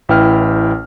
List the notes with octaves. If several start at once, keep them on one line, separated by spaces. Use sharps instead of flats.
A1 E4 B4 G5 F6